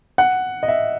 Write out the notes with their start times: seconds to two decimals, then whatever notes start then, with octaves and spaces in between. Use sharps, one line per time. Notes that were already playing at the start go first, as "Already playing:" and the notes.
0.18 F#5
0.63 D#5
0.68 E5